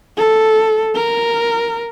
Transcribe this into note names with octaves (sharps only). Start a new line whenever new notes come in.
A4
A#4